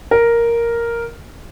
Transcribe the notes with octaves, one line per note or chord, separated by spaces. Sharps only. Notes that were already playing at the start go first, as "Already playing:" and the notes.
A#4